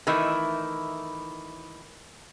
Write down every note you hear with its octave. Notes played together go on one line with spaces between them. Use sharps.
D#3 E3 A3 E4